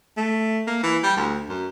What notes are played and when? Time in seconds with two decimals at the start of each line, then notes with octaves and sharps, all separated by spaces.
0.17 A3
0.67 A#3
0.83 E3
1.03 G3
1.17 D2
1.49 F#2